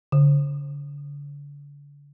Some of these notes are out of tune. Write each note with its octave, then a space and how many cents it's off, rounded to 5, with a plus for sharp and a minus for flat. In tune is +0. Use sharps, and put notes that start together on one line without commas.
D3 -40